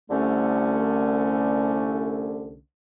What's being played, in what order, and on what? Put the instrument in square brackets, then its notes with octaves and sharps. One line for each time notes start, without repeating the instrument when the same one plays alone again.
[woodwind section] C2 D3 A3 C#4